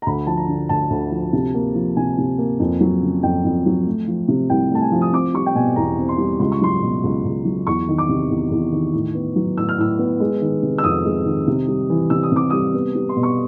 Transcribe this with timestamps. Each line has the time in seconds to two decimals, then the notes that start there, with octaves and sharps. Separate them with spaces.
0.02 A#5
0.06 D2 B5
0.27 F3 A5
0.37 A#5
0.48 D3
0.69 D2 A5
0.90 D2
1.11 F3
1.33 C3
1.54 A#3
1.75 F3
1.97 C3 G#5
2.18 C3
2.38 A#3
2.60 F2
2.81 F#3
3.02 C#3
3.23 F2 G5
3.45 F2
3.66 F#3
3.87 A3
4.07 F3
4.28 C3
4.50 C2 G5
4.71 A3 A5
4.82 G#5
4.92 F3
5.02 D#6
5.13 C4 D6
5.34 G3 C#6
5.46 G5
5.55 B2 G#5
5.76 E2 A#5
5.98 C4
6.09 C6
6.18 G3
6.39 C#2 C6
6.52 C#6
6.61 F#3 C6
6.82 B2
7.04 C#2
7.24 C#2
7.45 F#3
7.67 E2 C#6
7.88 D#3
7.98 D6
8.09 C3
8.30 E2
8.51 E2
8.72 D#3
8.93 A2
9.15 B3
9.36 F#3
9.57 A2 E6
9.69 F6
9.78 A2 E6
9.99 B3
10.20 G#3
10.42 D#3
10.62 C3
10.78 E6
10.84 F2 D#6
11.05 G#3
11.26 D#3
11.47 C3
11.68 G3
11.90 E3
12.10 C3 E6
12.23 D#6
12.32 C3 D6
12.50 G3 D#6
12.74 B3
12.95 G3
13.09 C6
13.16 B2
13.23 C#6